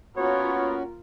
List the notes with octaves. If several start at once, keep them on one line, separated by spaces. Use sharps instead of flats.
A#3 B3 C#4 F4 F#4 A#4 C#5